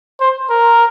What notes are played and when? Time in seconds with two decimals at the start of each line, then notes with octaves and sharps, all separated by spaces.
0.21 C5
0.50 A#4